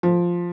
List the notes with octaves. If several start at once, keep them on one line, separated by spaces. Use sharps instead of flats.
F3